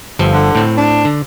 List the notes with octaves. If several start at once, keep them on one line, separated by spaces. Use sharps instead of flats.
G1 F3 A4
D3
A2 C4
D4
D3